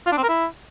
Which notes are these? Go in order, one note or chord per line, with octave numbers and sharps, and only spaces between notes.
F4
D4
C4
A#4
E4